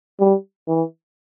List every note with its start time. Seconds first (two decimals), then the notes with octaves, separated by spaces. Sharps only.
0.20 G3
0.68 E3